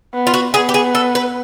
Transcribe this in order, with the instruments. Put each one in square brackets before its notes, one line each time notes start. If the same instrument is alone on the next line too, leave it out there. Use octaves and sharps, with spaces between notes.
[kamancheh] B3
[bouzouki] F4
F#4
[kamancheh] B3 [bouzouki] G#4
[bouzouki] G4
G#4
A4
B4